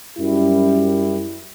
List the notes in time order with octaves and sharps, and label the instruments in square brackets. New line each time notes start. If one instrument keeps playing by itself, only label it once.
[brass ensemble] F#2 G3 E4